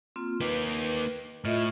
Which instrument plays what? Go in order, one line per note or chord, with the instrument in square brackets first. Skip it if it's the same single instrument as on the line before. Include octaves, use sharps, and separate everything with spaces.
[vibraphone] A#3 C4 F4
[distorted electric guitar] A#3 D#4 [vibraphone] B4 D6
[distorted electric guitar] A2 [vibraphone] F4 D#5 E5